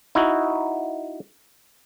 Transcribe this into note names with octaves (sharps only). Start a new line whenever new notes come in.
D#4 E4 F#4